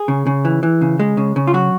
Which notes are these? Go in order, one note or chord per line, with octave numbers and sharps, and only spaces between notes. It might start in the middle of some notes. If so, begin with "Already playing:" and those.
Already playing: G#4
C#3
C#3
E3
E3
C#3
G#3
C#3
C#3
F4
F#3 F#4